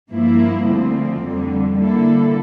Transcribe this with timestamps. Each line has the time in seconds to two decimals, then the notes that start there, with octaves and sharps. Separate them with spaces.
0.10 G2 F3 A#3 E4
0.66 D2 D3 F3 C4
1.22 F2 D3 G3
1.78 D3 G3 A#3 E4 A4